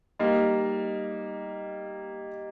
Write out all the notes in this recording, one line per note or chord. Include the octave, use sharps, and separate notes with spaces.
G3 A#3 D#4